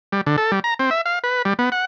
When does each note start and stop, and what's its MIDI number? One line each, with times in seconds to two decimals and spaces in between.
0.12 0.21 55
0.26 0.36 50
0.38 0.51 69
0.52 0.60 55
0.64 0.74 82
0.79 0.90 60
0.91 1.01 76
1.06 1.19 77
1.24 1.42 71
1.45 1.54 55
1.59 1.70 59
1.72 1.85 78